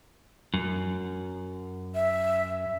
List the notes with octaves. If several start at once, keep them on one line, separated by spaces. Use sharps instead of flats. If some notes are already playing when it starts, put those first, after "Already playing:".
F#2
E5